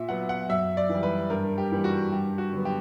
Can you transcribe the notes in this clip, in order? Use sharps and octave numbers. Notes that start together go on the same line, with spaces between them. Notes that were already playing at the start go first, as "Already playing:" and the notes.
Already playing: A#2 E5
F#3 B3 F#5
F#5
F#2 E5
D5
E3 G3
B4
G2 A#4
G4
E3 G3 A#3
F#4
G2 G4
F#4
D3 F#3 B3
G4